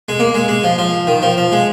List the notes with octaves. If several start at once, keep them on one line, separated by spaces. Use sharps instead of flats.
G#3
A#3
G#3
G#3
F3
F3
D#3
F3
F3
G#3